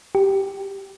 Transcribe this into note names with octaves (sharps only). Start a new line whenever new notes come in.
G4